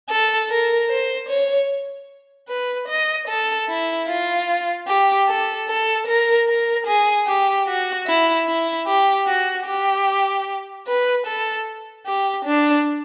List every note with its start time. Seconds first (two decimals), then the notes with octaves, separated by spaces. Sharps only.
0.09 A4
0.49 A#4
0.90 C5
1.28 C#5
2.48 B4
2.88 D#5
3.28 A4
3.68 E4
4.08 F4
4.87 G4
5.28 A4
5.68 A4
6.07 A#4
6.48 A#4
6.87 G#4
7.27 G4
7.67 F#4
8.07 E4
8.47 E4
8.87 G4
9.27 F#4
9.66 G4
10.87 B4
11.26 A4
12.06 G4
12.45 D4